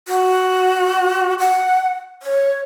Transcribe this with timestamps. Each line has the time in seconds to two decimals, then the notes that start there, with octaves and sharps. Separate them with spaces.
0.08 F#4
1.39 F#5
2.22 C#5